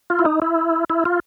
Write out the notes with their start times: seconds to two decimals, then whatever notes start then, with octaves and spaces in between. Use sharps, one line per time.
0.10 F4
0.19 E4
0.25 D#4
0.42 E4
0.90 E4
1.05 F4